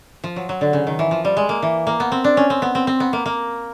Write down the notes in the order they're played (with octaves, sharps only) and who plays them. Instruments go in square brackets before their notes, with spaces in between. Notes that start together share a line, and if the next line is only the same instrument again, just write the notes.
[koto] F3
F#3
F#3
D3
C#3
D#3
E3
F3
G3
G#3
A#3
E3
A#3
B3
C4
D4
C#4
C4
B3
C4
C4
B3
A#3
A#3